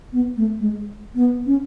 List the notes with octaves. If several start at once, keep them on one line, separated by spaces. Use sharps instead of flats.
B3
A3
G#3
B3
C#4